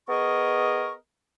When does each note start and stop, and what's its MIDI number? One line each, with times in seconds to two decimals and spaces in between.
0.08 0.93 59
0.08 0.93 68
0.08 0.93 70
0.08 0.93 75
0.08 0.93 85